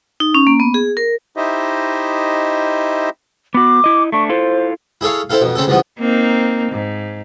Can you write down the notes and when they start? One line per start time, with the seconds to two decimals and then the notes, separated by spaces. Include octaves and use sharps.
0.20 D#4
0.35 C#4
0.47 A#3
0.60 B3
0.74 G#4
0.97 A#4
1.37 D#4 E4 G4 C5 D#5 E5
3.54 B3 F#4 D6
3.84 E4 D#5
4.12 A3 D4 C#6
4.29 E4 F4 A4 C5
5.01 E4 G#4 A4 C#5 F5
5.30 C4 E4 A4 F5
5.41 F2 B2
5.55 C#3 C4 C#4 A4
5.67 C#2 G2 E3 F3 B3
5.98 A#3 C4 D#4
6.72 G#2